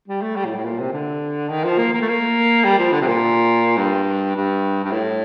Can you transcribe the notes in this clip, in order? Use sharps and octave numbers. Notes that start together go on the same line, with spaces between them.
G3
A3
G3
A2
A2
A#2
C3
D3
D#3
F3
A#3
A#3
A3
A#3
G3
F3
D3
C3
A#2
G2
G2
G2
A2